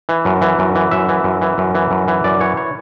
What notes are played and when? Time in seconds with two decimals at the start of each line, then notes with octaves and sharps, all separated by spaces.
0.09 E3
0.25 F#2
0.41 E3
0.59 F#2
0.75 E3
0.91 F#2 E5
1.09 E3
1.24 F#2
1.41 E3
1.58 F#2
1.75 E3
1.91 F#2
2.08 E3
2.24 F#2 D5
2.41 E3 C#5
2.57 C#5